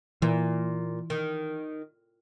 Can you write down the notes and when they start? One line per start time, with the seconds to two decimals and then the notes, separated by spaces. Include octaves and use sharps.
0.22 A#2 E3
1.10 D#3